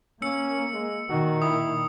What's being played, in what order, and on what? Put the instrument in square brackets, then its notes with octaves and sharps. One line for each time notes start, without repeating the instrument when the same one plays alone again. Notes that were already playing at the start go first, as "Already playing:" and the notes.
[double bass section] A#3 [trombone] C#4 [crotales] E6 C#7
[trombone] G#3
[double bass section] A#2 D#3 [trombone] F#4
[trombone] E4 [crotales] D#6